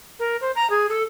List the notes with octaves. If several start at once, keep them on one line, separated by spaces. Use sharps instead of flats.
A#4
C5
A#5
G#4
A4